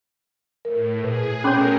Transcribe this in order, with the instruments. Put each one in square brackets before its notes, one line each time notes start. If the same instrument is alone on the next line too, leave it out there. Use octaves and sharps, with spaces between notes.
[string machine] A2 [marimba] A#4
[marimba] A#2 B4 [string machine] G#4
[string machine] B2 A3 A#4 [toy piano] C#4 C#5 [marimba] B5 C6 D6